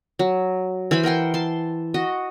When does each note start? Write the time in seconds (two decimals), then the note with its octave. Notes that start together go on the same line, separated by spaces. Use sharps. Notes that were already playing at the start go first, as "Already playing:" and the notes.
0.19 F#3
0.91 E3 C5 G#5 B5
1.03 A#4 F#5 G5 C6
1.34 A5 C6
1.94 F#4 D#5